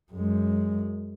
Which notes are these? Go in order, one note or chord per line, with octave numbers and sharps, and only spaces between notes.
F#2 G#3